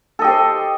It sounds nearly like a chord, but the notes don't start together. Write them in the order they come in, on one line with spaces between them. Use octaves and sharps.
A4 D#5 G4 C5